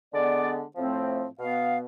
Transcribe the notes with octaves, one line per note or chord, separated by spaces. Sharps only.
D3 G#3 B3 D5
A2 F3 A3 C4
B2 B3 F5